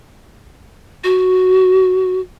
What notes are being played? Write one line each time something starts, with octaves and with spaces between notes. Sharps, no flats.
F#4